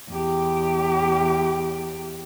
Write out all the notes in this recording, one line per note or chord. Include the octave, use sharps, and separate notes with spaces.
E2 G4